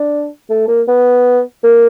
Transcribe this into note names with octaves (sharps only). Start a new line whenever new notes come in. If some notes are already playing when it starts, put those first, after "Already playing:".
Already playing: D4
A3
A#3
B3
A#3